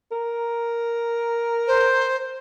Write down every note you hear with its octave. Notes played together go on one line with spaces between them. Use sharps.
A#4
C5